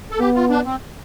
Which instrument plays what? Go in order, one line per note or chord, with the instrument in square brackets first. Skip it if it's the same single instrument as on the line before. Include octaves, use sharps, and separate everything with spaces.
[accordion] A4
[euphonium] B3 [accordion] G4
[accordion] F4
D4
C4